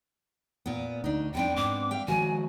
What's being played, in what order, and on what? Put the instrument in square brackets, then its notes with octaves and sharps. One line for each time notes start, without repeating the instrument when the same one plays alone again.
[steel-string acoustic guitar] A#2 B3
[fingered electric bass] D2 [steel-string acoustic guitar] D4 D#4
[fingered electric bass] F2 [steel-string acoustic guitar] B3 C4 D4 [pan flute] G5
[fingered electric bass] G#2 [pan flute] D6
[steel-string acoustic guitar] E5 F5 G5
[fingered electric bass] D#3 F3 G#3 [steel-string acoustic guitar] F#4 [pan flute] G#5